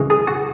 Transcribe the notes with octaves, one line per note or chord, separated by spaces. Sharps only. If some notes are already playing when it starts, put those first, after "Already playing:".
Already playing: C#3 E3 G#3
G#4
F#4